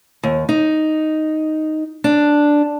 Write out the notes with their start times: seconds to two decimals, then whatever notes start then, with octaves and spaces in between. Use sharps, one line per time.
0.23 D#2
0.49 D#4
2.04 D4